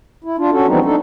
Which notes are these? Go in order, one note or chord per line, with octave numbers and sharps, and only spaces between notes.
E4
D4 F4
C#4 F#4 A4
E3 F3 G3 B3 C4 D#4
D4 D#4 A4